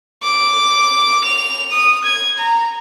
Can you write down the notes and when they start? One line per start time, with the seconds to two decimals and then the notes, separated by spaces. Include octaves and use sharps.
0.23 D6
1.24 F7
1.71 D#6
2.04 G#6
2.38 A#5